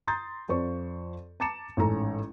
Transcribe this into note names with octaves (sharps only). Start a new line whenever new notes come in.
A#5 C6 D#6 G6 A6
F2 F3 C5 D5 C#6
A5 A#5 D6 A6 C#7 E7
A1 G#2 C#4 A4 A#5